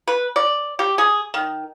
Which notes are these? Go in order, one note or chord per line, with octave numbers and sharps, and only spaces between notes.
B4
D5
G4
G#4
D#3